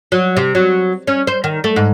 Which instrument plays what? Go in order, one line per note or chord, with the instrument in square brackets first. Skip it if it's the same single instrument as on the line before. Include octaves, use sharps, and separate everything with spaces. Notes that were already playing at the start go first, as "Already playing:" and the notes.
[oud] F#3
C3
F#3
C#4
C5
D#3
A3
G#2